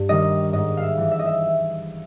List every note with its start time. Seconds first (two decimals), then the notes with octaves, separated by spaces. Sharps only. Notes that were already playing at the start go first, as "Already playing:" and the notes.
Already playing: G2
0.09 D#3 G3 D#5
0.53 G#2 D#5
0.77 E5 F5
0.97 E3 G3
1.12 E5
1.19 D#5
1.26 E5